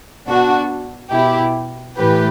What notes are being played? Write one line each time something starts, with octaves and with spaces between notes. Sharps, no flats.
B2 D4 F#4
B2 E4 G4
A2 E3 G4 B4